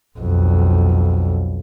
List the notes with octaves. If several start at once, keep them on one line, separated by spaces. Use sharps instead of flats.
B1 F2